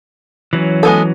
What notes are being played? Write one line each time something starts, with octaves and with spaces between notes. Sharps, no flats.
E3 F#3 C#4
G#3 B3 A4